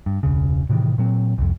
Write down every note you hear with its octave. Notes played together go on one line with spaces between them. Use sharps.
G2
E1 C#2 C#3
A2 C3 D#3 E3
A#2 F#3 C4
C2 F2